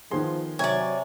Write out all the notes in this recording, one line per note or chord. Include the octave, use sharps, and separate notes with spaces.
D#3 F3 B3 G#4 C6
C3 F#3 C#5 D5 G#5